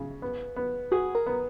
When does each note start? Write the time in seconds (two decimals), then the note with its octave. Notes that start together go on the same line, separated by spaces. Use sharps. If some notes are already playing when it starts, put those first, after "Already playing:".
Already playing: C#3
0.22 B3
0.56 B3
0.92 F#4 G#4
1.15 A#4
1.26 B3